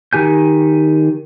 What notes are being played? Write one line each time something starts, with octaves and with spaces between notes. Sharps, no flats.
D#3 G4 G#5 G6